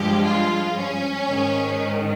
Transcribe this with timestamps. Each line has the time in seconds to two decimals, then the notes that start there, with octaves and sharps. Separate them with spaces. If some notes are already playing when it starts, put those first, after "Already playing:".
Already playing: G2 F3 G#3 G4
0.24 F4
0.77 C#4
1.29 G#2 D#3